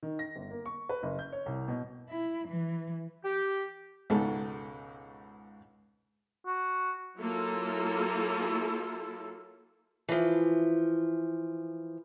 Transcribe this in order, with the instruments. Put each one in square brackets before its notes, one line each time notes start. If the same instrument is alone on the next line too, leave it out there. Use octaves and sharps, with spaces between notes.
[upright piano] D#3
A#6
G1
A#3
C#6
B4
F#1
G6
C#5
C2
B2
[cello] E4
E3
[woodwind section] G4
[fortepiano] C#2 G#2 B2 A4
[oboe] F#4
[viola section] F#3 A#3 E4 F4 A4
[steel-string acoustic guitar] E3 F3